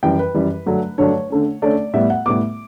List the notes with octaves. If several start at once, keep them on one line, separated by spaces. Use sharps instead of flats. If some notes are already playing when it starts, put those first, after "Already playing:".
F#2 E3 G3 G5
B4
F#2 E3 G3
G2 D3 F#3 A3 D4
G2 D3 F#3 A3 D4 C#5
D3 A3 C#4
D3 A3 C#4 D5
A2 G3 B3 E5
F#5
A2 G3 B3 D6